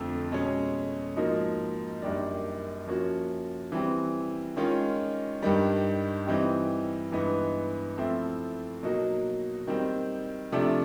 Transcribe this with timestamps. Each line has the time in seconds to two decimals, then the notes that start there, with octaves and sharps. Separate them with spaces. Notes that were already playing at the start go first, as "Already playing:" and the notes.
Already playing: F2 D3 F3 A3 C4
0.32 B2 G#3 C#4
1.16 G#2 F3 A#3 D#4 F#4
2.02 F#2 D#3 G3 A#3 D4
2.87 F3 A#3 C#4 F#4
3.72 E3 G3 C4
4.57 D#3 G#3 C#4 F4
5.42 G2 D#3 G3
6.27 E3 G3 C4 D#4 G4
7.12 G2 E3 G#3 B3 D#4
7.97 F3 A3 C4 E4
8.83 B2 F#3 A#3 D#4 F#4
9.67 D#3 G3 C4
10.52 C3 F3 A3 D4